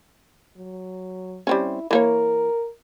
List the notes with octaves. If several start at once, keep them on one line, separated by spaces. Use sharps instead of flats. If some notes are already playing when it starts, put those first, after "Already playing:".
F#3
G3 C4 C#4 E4
E3 A#3 A#4 C#5